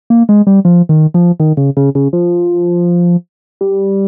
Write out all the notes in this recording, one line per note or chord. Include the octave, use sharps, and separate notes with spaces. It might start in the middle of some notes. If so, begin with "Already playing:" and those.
A#3
G#3
G3
F3
D#3
F3
D#3
C#3
C#3
C#3
F3
G3